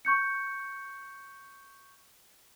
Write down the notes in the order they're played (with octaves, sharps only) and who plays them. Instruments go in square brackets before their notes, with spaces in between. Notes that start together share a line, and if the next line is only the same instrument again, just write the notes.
[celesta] C#6 G6 C#7